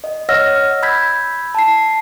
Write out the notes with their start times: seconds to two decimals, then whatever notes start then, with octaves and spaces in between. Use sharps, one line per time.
0.04 D#5
0.29 C#5 D#5 F#5 E6 F6 A#6
0.83 B5 E6 G6 G#6 B6
1.55 A5 C7